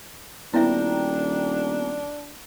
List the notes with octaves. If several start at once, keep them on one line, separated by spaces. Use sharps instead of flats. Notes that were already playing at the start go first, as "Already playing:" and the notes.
D#1 B3 D4 E4 E5 G5 A#5